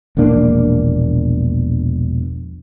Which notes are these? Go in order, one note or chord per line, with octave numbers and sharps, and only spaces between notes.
E1 A#1 A#3 D4